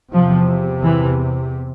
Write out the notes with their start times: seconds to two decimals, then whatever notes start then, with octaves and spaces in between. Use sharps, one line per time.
0.12 E2 C3 F3
0.83 E3